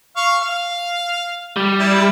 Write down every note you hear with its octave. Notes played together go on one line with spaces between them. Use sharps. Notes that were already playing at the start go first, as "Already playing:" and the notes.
F5 C#6
F5
G3
E4 D5